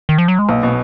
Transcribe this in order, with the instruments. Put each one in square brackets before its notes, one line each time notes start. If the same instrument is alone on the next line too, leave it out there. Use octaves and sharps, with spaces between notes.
[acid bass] D#3
F3
F#3
G#3
[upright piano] B1 [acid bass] A#3
[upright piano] B2